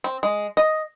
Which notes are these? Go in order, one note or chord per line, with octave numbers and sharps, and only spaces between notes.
C4
G#3
D#5